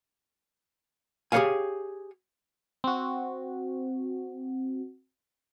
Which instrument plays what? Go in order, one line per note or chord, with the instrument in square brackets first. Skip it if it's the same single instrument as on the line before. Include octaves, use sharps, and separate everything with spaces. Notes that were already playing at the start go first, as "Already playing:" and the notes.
[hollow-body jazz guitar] G4 G#4 C5 C#5 F5 G#5
[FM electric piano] C4 F#4